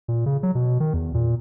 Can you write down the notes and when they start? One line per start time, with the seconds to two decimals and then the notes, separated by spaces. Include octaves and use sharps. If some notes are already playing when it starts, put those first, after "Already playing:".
0.08 A#2
0.26 C#3
0.43 F#3
0.55 B2
0.80 D#3
0.94 E2
1.14 A#2